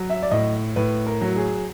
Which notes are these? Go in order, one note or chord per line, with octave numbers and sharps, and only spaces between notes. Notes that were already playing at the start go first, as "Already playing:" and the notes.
Already playing: F#3
E5
D5
A2 D#5
A2 B4
A#4
F#3
G#4